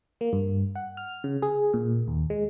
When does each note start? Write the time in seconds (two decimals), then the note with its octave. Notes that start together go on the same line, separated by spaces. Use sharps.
0.21 A#3
0.33 G2
0.75 F#5
0.97 F6
1.24 C#3
1.42 G#4
1.74 A#2
2.08 D#2
2.30 G#3